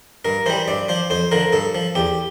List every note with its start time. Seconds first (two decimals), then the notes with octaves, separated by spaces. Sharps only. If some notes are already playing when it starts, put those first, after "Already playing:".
0.25 G2 A#4
0.46 E3 G3 C5
0.68 G2 D5
0.89 F3 C5
1.10 F2 C5
1.32 D3 F3 A#4
1.53 G2 A4
1.75 F3
1.95 E2 G4